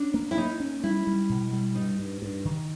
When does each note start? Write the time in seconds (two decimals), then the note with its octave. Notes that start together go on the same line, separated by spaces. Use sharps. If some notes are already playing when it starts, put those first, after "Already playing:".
Already playing: C#4 D4
0.14 A#3
0.31 E4
0.37 A#3 D#4
0.60 C#4
0.83 G3 E4
1.07 G3
1.29 B2
1.53 G3
1.75 G2 D#4
1.99 G2
2.22 G2
2.45 D#3